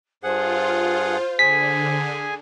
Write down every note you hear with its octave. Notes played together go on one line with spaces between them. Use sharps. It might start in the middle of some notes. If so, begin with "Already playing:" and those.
G2 F4 G#4 C5 F#5
D3 G#4 G#5 B6